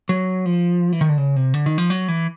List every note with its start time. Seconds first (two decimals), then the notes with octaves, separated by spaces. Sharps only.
0.09 F#3
0.46 F3
0.93 E3
1.01 D#3
1.09 D3
1.18 C#3
1.36 C3
1.54 D3
1.66 D#3
1.78 F3
1.90 F#3
2.08 E3